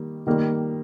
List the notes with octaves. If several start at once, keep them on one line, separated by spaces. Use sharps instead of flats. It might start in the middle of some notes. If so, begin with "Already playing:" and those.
Already playing: D#3 G3 A#3
D#3 G3 A#3